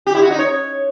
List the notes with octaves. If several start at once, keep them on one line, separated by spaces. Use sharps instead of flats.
G4
E4
F#4
D#4
C#5